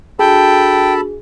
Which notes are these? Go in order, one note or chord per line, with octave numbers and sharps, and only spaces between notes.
D4 F#4 G#4 A4 G5 A5 B5